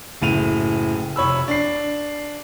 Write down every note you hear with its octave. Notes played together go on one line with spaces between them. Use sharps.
F#1 A2 D#7 F7
F1 C#5 B5 E6
D4 C7